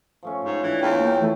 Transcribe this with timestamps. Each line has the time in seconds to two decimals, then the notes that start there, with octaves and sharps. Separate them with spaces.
0.23 F3 A3 C#4
0.45 G#2 G5
0.63 E3 D4
0.81 E2 C#3 G#3 C#4 G5
0.99 A#3
1.20 E3 A3